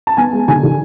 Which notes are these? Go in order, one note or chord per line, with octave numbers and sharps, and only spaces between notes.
A5
B3 G#5
G#3
D3 G#5
D3